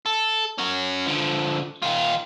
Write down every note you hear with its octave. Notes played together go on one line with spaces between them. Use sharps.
A4
C#4 F#4
D3 F3
D#3 F4